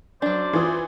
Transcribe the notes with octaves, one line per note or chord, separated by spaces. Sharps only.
F#2 F#3 D4 C5 D5
E3 F4 D#6